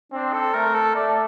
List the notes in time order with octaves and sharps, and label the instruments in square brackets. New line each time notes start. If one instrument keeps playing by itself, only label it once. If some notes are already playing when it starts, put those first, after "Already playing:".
[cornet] C4 [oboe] D4
[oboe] A4
[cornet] A3 [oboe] A#4
[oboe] A4
[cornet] A3 [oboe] D5